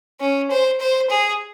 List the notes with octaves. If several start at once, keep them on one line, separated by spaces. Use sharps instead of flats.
C#4
C5
C5
G#4